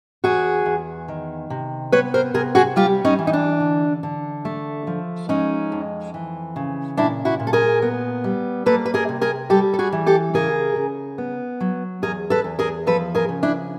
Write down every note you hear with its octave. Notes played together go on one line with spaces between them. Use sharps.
E2 F#4 G#4
E2
D#3
C3
B3 B4 C#5
A#4 C5
C3 G#4 A#4
F#4 G#4
G3 F4 G4
C#4 D#4
E3
D#4
D4
D3
D3
A3
F3
G#3 C#4 D#4
F2
E3
C#3
A#2 D4 E4
E4 F#4
A#2
A4
G#4 A#4
B3
G3
A#3 A4 B4
B4
G#4 A#4
C3
G#4 A#4
G3 G4 A4
A4
F#4 G#4
E3
G4 A4
C#3 G#4 A#4
C#3
B3
F#3
E2 G#4 A#4
A4 B4
E2
G#4 A#4
F3 A4 B4
G#4 A#4
C#3
D4 E4